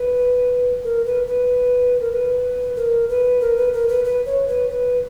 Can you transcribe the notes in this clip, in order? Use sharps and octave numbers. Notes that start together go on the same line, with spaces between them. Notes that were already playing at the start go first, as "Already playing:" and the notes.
Already playing: B4
A#4
B4
B4
A#4
B4
A#4
B4
A#4
B4
A#4
B4
B4
C#5
B4
B4